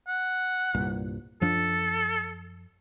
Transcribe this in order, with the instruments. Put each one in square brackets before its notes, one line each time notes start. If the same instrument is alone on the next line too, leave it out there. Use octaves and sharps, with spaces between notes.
[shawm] F#5
[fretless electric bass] C2 G2 A#2
[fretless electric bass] F#2 F3 D4 [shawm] A4